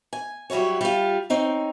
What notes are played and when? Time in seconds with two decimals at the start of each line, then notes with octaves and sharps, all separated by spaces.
0.13 G#5
0.50 F#3 G3 E4 F#4 C#5
0.81 G3 F4
1.30 C4 D#4 C#5